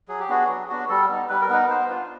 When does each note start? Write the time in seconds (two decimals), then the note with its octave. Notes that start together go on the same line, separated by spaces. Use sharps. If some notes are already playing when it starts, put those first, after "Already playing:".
0.08 F#3 G#4
0.20 G4
0.29 B3 D4 F#4 G#4
0.48 F#3
0.69 B3 D4 F#4
0.89 G3 A4
1.09 B3 D#4
1.29 G3 B4
1.41 A#4
1.49 B3 D#4 B4
1.69 B3 C5
1.90 D4 F4